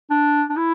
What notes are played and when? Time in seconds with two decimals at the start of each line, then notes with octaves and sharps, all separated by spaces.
0.11 D4
0.50 D4
0.57 E4